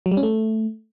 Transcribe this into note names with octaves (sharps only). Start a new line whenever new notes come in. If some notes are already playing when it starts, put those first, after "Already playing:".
F#3
G3
C#4
A3